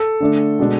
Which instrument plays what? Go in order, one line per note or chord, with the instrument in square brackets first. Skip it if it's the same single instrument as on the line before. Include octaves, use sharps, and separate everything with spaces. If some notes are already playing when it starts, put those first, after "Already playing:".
Already playing: [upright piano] A4
[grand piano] D3 A3 D4
B2 G#3 D4